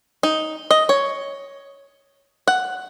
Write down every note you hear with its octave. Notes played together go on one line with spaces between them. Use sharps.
D#4
D#5
C#5
F#5